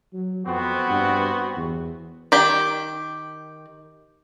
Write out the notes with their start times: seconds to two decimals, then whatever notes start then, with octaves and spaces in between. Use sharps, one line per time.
0.13 F#3
0.46 F2 B3 C4 F#4
0.89 G2
1.56 E2
2.32 D#3 G4